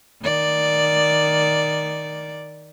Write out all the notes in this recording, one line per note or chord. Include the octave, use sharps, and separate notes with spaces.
D#3 D5